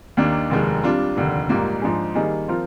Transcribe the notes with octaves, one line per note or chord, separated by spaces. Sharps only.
D#2 D#3 A#3 D4
F1 D#2 D#3 G#3
C3 G3 D4 F4
F1 D#2 D3
A#1 G#2 G3 A#3
G#2 F3 G#3 D4 G#4
D#3 G3 A#3 D#4 G#4
F3 C4 F4 A#4